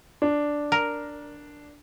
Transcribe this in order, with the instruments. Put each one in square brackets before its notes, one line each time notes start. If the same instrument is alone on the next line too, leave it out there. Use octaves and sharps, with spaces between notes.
[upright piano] D4
[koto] A#4